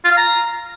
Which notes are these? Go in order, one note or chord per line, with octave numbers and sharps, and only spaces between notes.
F4
F5
A#5